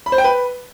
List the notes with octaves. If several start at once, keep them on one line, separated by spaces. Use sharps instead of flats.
B5
C5
G5
B4